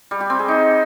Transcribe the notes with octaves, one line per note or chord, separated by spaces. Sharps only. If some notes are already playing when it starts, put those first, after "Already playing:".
G3
G4
C4
G#4
D#4